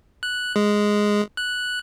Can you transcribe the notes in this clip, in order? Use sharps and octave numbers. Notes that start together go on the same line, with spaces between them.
F#6
G#3
F#6